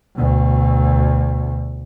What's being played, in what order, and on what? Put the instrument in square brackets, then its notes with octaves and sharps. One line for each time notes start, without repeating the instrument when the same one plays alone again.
[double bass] D2 B2